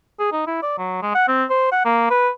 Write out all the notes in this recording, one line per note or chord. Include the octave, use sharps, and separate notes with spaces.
G#4
D#4
E4
D5
F#3
G#3
F#5
C4
C5
F#5
A#3
B4